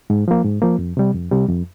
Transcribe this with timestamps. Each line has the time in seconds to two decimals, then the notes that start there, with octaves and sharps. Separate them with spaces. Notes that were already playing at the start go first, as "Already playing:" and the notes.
0.10 G#2
0.28 F3 A#3
0.44 G#2
0.62 F3 A#3
0.79 F2
0.97 C3 G3
1.14 F2
1.31 C3 G3
1.48 F2